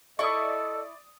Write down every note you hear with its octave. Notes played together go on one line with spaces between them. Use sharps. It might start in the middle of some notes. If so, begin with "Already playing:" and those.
E4 A4 D5 D#5 C#6 D#6